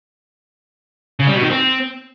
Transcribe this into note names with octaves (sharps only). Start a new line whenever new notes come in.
C#3
G3
B2
D#3
C4